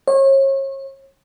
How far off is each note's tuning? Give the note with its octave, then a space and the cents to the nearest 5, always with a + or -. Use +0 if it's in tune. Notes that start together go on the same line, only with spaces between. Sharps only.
C#5 -35